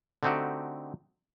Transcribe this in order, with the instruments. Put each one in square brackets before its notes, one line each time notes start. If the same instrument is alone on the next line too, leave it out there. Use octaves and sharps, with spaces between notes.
[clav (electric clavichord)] D3 A3 C4 D#4 F#4 G4